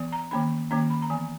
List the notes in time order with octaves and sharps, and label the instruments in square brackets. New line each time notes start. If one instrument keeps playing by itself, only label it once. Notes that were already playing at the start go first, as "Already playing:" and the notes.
Already playing: [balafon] E3 B3
A#5
D#3 A#3 C#4 B5
D#3 A#3 C#4 A#5
B5
A#5
E3 B3 G#5